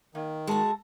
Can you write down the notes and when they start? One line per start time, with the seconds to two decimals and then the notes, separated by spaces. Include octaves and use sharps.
0.15 D#3 A#3
0.47 G#3 F#4 A4 A5